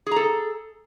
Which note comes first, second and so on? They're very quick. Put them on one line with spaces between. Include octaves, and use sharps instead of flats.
G#4 A#5 A4